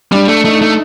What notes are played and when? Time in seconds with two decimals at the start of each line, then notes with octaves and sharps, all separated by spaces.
0.12 G3 D4
0.28 A3
0.45 A3 D#4
0.62 A3